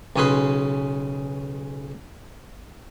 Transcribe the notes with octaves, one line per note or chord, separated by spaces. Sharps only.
B1 C#3 C#4 G#4 B4 C6